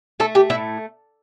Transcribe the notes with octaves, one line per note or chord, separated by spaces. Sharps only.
A3 A4
G4
A2 E4